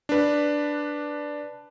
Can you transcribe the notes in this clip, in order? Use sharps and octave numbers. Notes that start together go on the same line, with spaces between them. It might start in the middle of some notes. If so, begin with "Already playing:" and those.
D4 B4